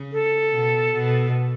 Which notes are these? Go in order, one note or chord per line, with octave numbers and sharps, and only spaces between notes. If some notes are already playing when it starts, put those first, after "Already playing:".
Already playing: C#3
A4
B2
B2